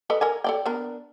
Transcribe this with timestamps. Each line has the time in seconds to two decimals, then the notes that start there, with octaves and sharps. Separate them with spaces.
0.10 A4 B4 D#5
0.21 A4 A#4 G#5
0.44 A4 D5 G5
0.66 B3 D4 A#4